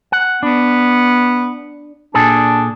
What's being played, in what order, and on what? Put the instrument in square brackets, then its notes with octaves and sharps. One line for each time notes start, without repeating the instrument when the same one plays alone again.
[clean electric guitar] F#5
[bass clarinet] B3 [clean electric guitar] D4
[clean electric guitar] A#2 G#4 A4 [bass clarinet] D4